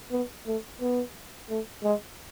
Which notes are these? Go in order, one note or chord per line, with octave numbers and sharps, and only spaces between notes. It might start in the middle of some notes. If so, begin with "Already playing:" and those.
B3
A3
B3
A3
G#3